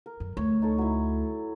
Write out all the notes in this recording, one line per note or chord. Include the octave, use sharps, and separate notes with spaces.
A#4
F#2
D2 C#5
D#4 A4 C#5
F#3 E4